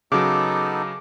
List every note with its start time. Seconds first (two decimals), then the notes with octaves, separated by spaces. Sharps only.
0.12 C#3 F#3 B3 D#4 G#4 A4 D6